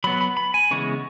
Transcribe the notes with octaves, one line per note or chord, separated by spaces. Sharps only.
F#3 B3 B5
B5
B5
G#5
C#3 E3 G#3 B3 C#6